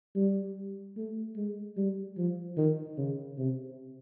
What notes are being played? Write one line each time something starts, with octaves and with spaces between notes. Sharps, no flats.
G3
A3
G#3
G3
F3
D#3
C#3
C3